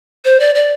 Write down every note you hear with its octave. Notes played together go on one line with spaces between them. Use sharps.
C5
D5
D5